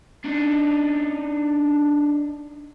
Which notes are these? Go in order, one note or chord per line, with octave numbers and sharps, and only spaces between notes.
D4 D#4